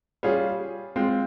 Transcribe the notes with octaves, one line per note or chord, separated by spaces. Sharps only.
G3 C#4 F4 G#4
G#3 C4 F4